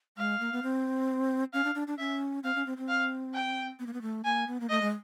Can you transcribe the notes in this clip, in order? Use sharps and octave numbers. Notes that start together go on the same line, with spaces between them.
G#3 F5
A#3
B3
C4
C#4 F5
D4
D4
D4
C#4 E5
C4 F5
C#4
C4
C4
F5
G5
B3
A#3
B3
A3
A#3 G#5
B3
A#3
A3 D#5
G#3